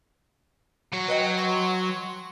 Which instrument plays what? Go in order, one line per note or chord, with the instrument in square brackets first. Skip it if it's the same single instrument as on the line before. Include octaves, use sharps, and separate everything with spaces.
[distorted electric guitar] F#3 C#5
[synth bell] B4 D#5 G5
C6 C#6